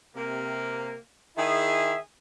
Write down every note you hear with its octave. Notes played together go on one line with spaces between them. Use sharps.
C3 A#3
D#3 E4 G#4 E5